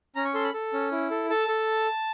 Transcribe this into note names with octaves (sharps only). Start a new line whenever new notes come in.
C#4 A#5
C#6
A4 C6
B5
A4
C#4
E4
A4
A4 A5
A4